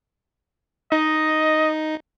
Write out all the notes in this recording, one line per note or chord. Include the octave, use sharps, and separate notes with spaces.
D#4 D#5